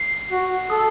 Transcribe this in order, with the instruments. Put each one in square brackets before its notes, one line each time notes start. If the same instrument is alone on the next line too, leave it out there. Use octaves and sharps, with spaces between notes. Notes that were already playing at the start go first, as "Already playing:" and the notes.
Already playing: [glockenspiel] C7
[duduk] F#4
[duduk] A4 [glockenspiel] D#6